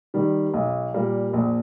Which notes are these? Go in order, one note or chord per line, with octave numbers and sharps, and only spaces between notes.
D#3 G3
B1
A#2 G3 A#3
A#1